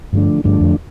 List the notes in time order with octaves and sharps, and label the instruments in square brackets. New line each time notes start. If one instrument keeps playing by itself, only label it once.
[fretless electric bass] G2 [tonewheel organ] D3 F3 A3 D4
[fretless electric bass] G2 [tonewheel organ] D3 F3 A3 D4
[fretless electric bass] F2